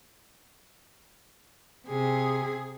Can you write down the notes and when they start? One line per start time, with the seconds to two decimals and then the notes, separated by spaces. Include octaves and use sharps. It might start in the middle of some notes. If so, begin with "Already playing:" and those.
1.88 C3 G#4